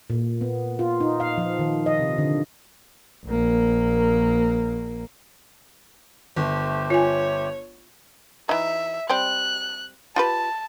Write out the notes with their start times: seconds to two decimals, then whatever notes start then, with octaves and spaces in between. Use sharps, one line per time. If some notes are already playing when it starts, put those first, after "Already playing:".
0.10 A#2
0.41 B3
0.79 F4
1.00 D#4
1.20 F5
1.38 F3
1.59 D#3
1.86 D#5
1.99 C3
2.18 D3
3.26 A#1 A#3
6.36 G1 A3 G4 C5
6.90 F4 C#5 G#5
8.49 E3 D#4 E5
9.10 G3 C4 F#6
10.16 F4 G4 B4 A5